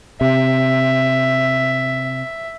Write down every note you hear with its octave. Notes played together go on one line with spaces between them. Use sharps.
C3 E5